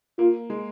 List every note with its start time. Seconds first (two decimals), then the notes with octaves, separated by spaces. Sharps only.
0.19 A#3 F4
0.50 G#3